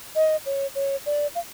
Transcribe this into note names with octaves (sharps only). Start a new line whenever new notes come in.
D#5
C#5
C#5
D5
F5